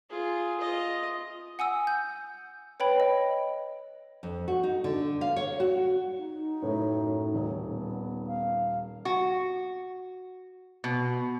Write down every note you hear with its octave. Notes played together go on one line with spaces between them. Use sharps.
F4 G#4
F4 D#5
F#5 G#5 D#6 E6
G6
B4 C#5 G5 B5
D#5
F2
F#4
D#4
D3
F5
C#5
F#4
D#4
F#2 A2
D#1
B3
F5
F#4
B2